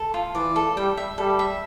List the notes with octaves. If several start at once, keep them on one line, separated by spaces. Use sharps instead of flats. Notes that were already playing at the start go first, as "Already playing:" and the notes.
Already playing: A4
F4
E3 D5
A4
G3 G5
E5
G3 A4
E5